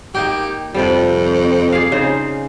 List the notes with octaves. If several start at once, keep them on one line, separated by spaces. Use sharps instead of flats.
A#3 D#4 G4 G5
F2 C3 F3 G3
G#4 D5 F5
C#3 D#4 C5